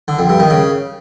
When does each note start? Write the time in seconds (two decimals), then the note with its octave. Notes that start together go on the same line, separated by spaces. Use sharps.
0.08 D3
0.19 F2
0.29 G2
0.40 D#3
0.50 C#3